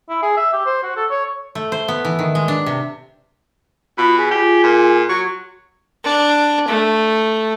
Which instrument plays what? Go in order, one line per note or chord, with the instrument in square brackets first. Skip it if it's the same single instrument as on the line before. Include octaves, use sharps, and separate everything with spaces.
[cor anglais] E4
G#4
E5
G4
C5
F#4
A4
C#5
[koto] A3
C5
B3
E3
D#3
G#3
D4
C3
[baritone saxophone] B2 [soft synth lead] F4 [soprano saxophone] B5
[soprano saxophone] G#4 [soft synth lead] B6
[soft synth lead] F4 [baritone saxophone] G4
[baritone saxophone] A#2
[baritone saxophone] F#3 [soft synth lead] F#4 [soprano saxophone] C#6
[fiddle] D4
A3